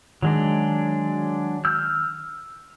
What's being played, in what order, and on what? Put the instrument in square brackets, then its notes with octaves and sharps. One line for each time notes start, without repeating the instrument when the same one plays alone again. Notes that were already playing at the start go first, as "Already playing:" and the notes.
[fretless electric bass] D#3 [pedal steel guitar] F#3 G#3 D4
[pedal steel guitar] E6 F6 G6